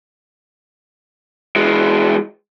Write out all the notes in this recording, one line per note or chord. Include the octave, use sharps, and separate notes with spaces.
E3 G#3